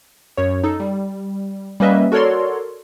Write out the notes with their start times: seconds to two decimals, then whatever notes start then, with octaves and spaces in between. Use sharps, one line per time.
0.37 F#2 C#5
0.64 D#4 A4
0.80 G3
1.80 G3 A#3 C#4 B4 D#5 E5
2.12 F#4 A4 A#4 C#5 D5 C6